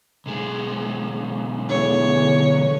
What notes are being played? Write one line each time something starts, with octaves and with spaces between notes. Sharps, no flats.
B1 G#3
E2 D3 C#5